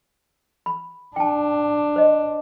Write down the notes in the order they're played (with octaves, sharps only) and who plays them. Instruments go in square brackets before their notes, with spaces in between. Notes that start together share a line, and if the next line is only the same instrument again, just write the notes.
[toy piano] B5
[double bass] D4 [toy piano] G5 A5
[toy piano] C5 D#5